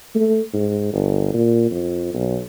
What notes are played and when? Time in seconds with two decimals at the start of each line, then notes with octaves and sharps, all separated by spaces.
0.15 A3
0.54 G#2
0.94 G1
1.34 A#2
1.71 F2
2.14 B1